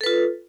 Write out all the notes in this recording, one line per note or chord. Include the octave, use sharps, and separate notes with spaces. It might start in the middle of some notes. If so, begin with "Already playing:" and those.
F4 A4 B4